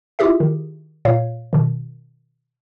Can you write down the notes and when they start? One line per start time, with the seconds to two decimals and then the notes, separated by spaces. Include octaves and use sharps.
0.19 E4 F4 G4 G#4 E5
0.40 D#3
1.05 A#2 C#5 F5
1.53 B2 D#3